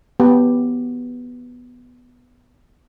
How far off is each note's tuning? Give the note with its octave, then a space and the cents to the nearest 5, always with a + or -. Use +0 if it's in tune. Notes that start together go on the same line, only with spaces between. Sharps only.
B3 +0 G4 +0